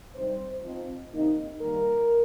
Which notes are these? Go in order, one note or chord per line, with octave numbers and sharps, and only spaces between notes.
C3 G3 D#4 C5
F3 C4 D#4
C3 D#3 A#3 D#4
D#3 G3 A#3 D#4 A#4